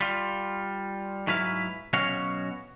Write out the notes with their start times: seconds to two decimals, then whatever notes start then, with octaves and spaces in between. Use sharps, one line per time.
0.01 G3 F4
1.27 G#2 F#3 E4 B4 F5
1.93 B2 F#3 C#4 F#4 C#5 F5